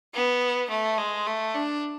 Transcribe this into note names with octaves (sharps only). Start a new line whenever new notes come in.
B3
A3
G#3
A3
D4